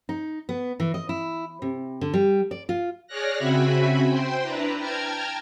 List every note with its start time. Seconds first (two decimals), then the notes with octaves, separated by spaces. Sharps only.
0.09 D#4
0.49 B3
0.80 E3
0.94 D#5
1.09 E4
1.62 C3
2.01 D3
2.14 G3
2.51 D5
2.69 F4
3.07 G#4 C#5 D5 F6 F#6 A#6
3.37 C#3 C4 F#4 E5 G#5 B5
4.07 C5 G5 C6
4.43 D4 E4 B4 A#5
4.77 G5 A5 A#5 F6 G#6